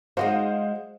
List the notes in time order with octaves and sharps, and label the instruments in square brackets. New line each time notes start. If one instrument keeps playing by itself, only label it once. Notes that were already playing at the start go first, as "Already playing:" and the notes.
[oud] G#3 D#4 F#4 [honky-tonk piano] C5 F5 F#5